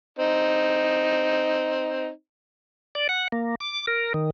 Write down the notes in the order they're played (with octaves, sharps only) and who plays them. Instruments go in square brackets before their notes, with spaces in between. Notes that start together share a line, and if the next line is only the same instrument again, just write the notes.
[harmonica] C4 D#4
[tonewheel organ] D5
F#5
A#3
D6
A#4
D#3